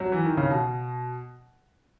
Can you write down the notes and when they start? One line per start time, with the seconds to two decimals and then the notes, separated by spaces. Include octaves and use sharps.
0.00 F#3
0.12 E3
0.25 D#3
0.37 C#3
0.50 B2